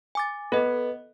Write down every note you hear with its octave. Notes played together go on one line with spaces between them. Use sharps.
G#5 D6 A6
B3 A4 D#5